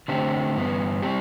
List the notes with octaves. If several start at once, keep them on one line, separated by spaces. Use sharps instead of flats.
D3 A3 C4 G4
G2 E3 B3
G3 C4 G4